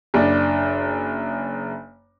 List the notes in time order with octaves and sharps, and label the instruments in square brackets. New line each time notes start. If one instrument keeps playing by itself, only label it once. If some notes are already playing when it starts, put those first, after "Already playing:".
[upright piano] F#1 D4